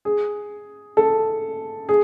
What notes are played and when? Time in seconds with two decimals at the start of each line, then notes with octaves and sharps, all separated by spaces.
0.05 G#4
0.97 A4
1.89 G#4